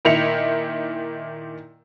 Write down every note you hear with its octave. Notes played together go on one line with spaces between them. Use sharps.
A#2 D#3 E4 C#7 F7